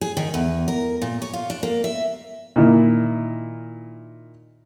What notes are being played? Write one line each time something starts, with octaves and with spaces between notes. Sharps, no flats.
G#4
D#3
E2
A#4
A#2
C#5
F4
D4
A#3
E5
A#2 D#3 E4